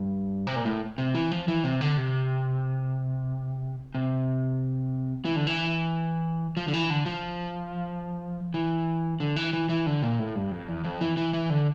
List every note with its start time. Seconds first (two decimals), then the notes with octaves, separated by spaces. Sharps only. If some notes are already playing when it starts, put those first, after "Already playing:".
Already playing: G2
0.47 C3
0.56 A#2
0.65 A2
0.98 C3
1.15 E3
1.31 F3
1.48 E3
1.64 C3
1.81 D3
1.97 C3
3.95 C3
5.25 E3
5.36 D3
5.47 E3
6.57 F3
6.68 D3
6.73 E3
6.90 D3
7.06 F3
8.54 E3
9.20 D3
9.36 E3
9.53 E3
9.69 E3
9.86 D3
10.03 A#2
10.19 A2
10.35 G2
10.51 F2
10.68 E2
10.84 F2
11.01 E3
11.17 E3
11.33 E3
11.50 D3